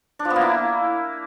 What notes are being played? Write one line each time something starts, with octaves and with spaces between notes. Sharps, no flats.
D4
F3
B3
A#3
E4